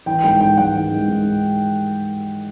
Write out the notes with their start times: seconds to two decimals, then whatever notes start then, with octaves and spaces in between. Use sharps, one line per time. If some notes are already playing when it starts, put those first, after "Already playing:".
0.06 E3 G5
0.23 G#2 G5
0.41 G#2 G5
0.57 G#2 F#5
0.74 E3
0.91 G#2
1.08 G#2